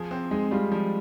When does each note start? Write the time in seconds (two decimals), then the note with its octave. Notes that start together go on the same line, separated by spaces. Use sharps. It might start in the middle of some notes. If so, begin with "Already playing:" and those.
Already playing: F3 G#4
0.11 C4
0.31 G#3 D#4
0.51 G3 F4
0.72 F3